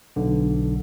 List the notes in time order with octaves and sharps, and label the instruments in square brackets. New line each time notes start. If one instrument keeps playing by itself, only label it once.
[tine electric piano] B1 D3